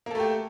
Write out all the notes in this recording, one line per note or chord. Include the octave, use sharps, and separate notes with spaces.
A3 A#3 G4 A4